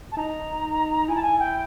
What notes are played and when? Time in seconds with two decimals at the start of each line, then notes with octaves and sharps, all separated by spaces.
0.11 A5
0.17 D#4 A#5
1.08 E4 G#5
1.14 A5
1.22 G#5
1.38 G5